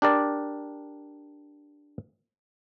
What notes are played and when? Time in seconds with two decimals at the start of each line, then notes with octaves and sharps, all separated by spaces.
0.02 D4 G4 A#4 D5